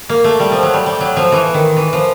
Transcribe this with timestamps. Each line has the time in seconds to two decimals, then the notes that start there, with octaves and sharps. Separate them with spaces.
0.09 A#3
0.24 A3
0.40 G3
0.52 F3
0.63 F#3
0.74 G3
0.86 G3
1.01 F#3
1.16 F3
1.32 E3
1.54 D#3
1.77 E3
1.93 F3